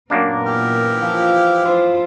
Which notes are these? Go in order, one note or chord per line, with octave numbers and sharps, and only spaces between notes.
F#2 A#2 A#3 B3 D4 A#4
E3 G4 F6
F3
E4 F4 C5